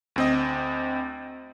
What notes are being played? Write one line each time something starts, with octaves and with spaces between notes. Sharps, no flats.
D2 C4 D#5